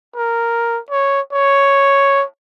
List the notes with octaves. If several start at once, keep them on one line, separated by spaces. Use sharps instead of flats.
A#4
C#5
C#5